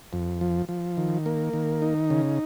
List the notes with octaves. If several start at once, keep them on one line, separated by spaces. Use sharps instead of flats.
F2
F3
F3
D#3
A#3
D#3
D#4
C#3